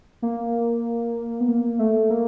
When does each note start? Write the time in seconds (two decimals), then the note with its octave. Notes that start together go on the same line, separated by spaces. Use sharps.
0.22 A#3
1.41 B3
1.48 A#3
1.79 A3
2.10 A#3